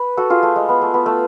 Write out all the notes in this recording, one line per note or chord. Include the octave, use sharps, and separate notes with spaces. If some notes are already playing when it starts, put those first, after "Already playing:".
Already playing: B4
F#4 A4
F4 G#4
A3
G#3
B3
A3
B3
A3